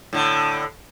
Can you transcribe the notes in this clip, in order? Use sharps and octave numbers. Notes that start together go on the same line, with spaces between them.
A2 D3